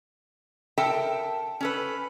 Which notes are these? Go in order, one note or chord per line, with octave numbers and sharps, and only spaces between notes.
A4 A#4 E5 G5 A5
C#4 A4 B4